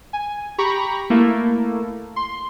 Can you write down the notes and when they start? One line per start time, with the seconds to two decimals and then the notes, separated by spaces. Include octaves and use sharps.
0.13 G#5
0.58 G4 A#5 B5 C#6
1.10 A3 A#3 E4
2.16 C6